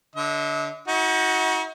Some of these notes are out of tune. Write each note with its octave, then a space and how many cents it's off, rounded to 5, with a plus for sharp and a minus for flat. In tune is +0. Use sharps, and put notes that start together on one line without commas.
D3 -10 E5 -45
D#4 +45 F#4 +0